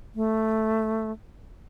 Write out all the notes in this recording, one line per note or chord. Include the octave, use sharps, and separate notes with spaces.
A3